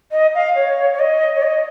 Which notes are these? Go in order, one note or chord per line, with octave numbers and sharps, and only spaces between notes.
D#5
F5
C#5
C#5
D#5
C#5
D#5